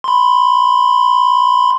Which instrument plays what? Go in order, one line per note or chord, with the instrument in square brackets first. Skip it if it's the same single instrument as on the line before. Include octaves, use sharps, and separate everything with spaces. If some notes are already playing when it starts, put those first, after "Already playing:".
[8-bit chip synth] B5 C6